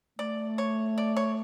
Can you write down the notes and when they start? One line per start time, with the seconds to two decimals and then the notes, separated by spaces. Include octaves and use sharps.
0.19 A3 D5
0.58 C#5
0.98 D5
1.17 C#5